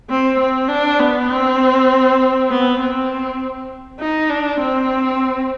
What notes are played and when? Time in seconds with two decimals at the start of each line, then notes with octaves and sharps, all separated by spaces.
0.09 C4
0.40 C4
0.69 D4
1.00 B3
1.30 C4
2.50 B3
2.80 C4
4.00 D#4
4.30 D4
4.60 C4